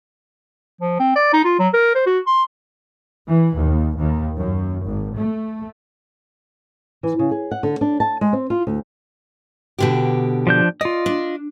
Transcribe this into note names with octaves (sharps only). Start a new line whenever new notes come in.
F3
C4
D5
D#4
F4
F#3
A#4
C5
F#4
C6
E3
D#2
D#2
F#2
G#1
A3
E3
C#3
G#4
F#5
D3
D4
A5
G#3
C4
F4
D2
B2 D3 G4
F3 D4 G6
F4 D5 D#5
D4